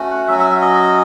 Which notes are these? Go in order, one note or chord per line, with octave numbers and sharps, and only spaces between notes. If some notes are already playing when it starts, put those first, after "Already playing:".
Already playing: A3 C#4 F#4
F#5
F#3 C#4 F#4 E5
E5
E5
D#5